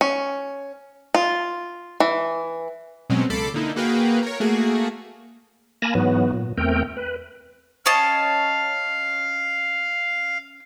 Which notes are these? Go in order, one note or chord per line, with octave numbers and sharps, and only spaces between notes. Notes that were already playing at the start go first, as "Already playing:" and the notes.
C#4
F4
E3
B2 F#3 G#3 C4 C#4
C#2 A4 B5 D6 C7
D3 A#3 D#4 E4
A#3 F#4 G#4 B4 F5 G5
A#4 C#5
A3 A#3 F#4 G#4
A#3 G#5 A5 B5 A#6
G#2 E3 F#3 B3
A#2
E2 A3 C4 A#4 G5
B4
C#4 D#5 F5 A5